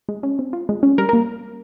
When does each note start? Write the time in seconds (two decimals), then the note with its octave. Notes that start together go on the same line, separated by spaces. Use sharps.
0.09 G#3
0.23 C#4
0.39 C4
0.53 F4
0.69 G#3
0.83 C#4
0.98 G3 A#4
1.09 A#4
1.13 A#3